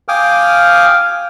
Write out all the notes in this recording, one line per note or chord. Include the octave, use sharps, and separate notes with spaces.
F5 G5 G#5 D6 D#6 F6